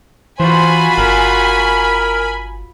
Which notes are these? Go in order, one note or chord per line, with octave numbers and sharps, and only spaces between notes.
E3 F4 F#4 C5 G#5 B5
G1 A#4